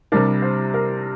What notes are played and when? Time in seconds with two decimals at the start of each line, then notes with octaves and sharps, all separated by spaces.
0.12 C3 G3 D4 A#4
0.42 C5
0.74 A#4